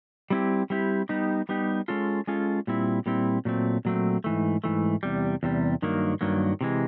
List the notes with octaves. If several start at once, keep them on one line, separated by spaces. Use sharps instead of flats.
G3 C4 E4 G4
G3 C4 E4 G4
G3 B3 D#4 G4
G3 B3 D#4 G4
G#3 C#4 F4 A4
G#3 C#4 F4 A4
A#2 G3 C4 E4
A#2 G3 C4 E4
A#2 F#3 A3 C4
A#2 F#3 A3 C4
G#2 E3 A3
G#2 E3 A3
E2 C3 G3
E2 C3 G3
G2 D#3 F#3 A#3
G2 D#3 F#3 A#3
C3 E3 G#3